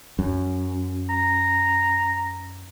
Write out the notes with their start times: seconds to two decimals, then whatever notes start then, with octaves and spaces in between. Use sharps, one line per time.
0.19 F#2
1.10 A#5